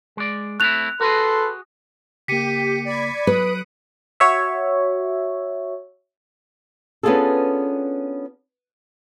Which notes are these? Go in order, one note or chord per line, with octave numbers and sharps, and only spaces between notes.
G#3 D5
A3 C4 E4 F#6 F7
F#4 G#4 A4 B4 C6
C#3 A#3 G4 B6 C#7 D#7
D5 B5 G#6
F#3 B4 D#6 F#6 D7
F#4 C#5 E5
B3 C#4 D4 F4 G#4 A4